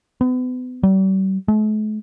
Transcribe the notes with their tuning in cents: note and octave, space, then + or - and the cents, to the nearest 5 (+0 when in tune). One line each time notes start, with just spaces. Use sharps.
B3 +35
G3 -40
A3 -45